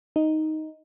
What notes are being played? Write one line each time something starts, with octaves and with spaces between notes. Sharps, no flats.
D#4